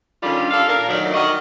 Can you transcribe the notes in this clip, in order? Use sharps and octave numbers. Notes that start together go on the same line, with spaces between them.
D3 D#3 G3 C#4 F4
D4 A4 F5
A#2 A#4
D2 D#3 F#3 D5
D#3 G3 F#4 D#5